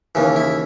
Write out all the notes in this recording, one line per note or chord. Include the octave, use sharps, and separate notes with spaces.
D#2 C#3 E3
E4